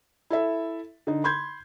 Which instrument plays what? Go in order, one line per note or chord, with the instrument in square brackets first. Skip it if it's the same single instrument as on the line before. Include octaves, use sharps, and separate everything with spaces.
[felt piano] E4 A4 E5
D3 D#4
B5 C6 G6 G#6